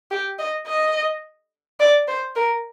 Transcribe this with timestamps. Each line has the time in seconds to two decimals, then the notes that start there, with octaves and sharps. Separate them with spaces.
0.11 G4
0.39 D#5
0.67 D#5
1.80 D5
2.08 C5
2.36 A#4